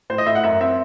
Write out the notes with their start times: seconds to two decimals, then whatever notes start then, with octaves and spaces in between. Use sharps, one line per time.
0.10 A2 C5
0.18 D#5
0.26 A2 E5
0.35 F#5
0.44 F#2 E5
0.60 C4 E5